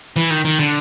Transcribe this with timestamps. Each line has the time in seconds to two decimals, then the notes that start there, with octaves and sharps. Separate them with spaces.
0.16 E3
0.30 D#3
0.45 D#3
0.59 D3